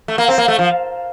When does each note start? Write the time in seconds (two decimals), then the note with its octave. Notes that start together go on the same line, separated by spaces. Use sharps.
0.08 A3
0.18 A#3
0.28 C4
0.38 A#3
0.48 A3
0.59 F3